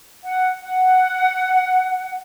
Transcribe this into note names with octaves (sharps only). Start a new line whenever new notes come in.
F#5
F#5